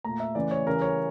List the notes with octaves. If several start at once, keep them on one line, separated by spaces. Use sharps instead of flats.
A#2 A3 A#5
E5
C#3 E3 A3 D5
C#5
C#3 E3 G3 A#4
C#5